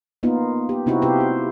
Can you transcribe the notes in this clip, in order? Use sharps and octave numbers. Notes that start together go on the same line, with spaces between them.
A#3 B3 D#4 F4
G4
C3 C4 D#4 E4 F#4
C3 F4 G4 B4 C5
F#4